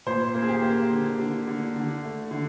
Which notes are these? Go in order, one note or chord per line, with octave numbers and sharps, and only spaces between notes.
A#2 C5
A#3
G#4
G4
A#3
D3
D3
D3
D3
A3
D3